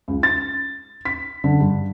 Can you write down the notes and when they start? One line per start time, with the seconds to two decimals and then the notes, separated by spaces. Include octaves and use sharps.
0.08 C#2
0.23 A6
1.05 B6
1.44 D3
1.60 G2